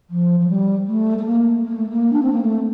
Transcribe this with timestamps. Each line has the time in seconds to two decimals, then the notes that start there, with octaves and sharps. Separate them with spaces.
0.10 F3
0.40 F3
0.48 G3
0.87 A3
1.19 A3
1.26 A#3
1.65 A#3
1.77 A3
1.90 A#3
2.13 D4
2.23 C4
2.33 A#3
2.43 A3